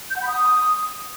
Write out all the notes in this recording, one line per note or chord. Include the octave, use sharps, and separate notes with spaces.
G6
F#5
B5
D#6